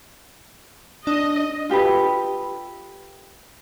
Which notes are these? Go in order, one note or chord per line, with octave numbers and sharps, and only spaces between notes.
D4 D#5
F4 G4 A4 B4